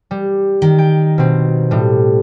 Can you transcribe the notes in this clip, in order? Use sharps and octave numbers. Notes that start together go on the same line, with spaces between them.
G3
D#3
G5
B2 C4
A2 G3